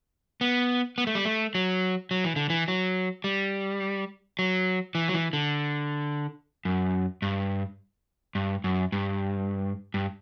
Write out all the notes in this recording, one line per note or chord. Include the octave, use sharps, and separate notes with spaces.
B3
B3
A3
G3
A3
F#3
F#3
E3
D3
E3
F#3
G3
F#3
E3
F#3
E3
D3
F#2
G2
G2
F#2
G2
G2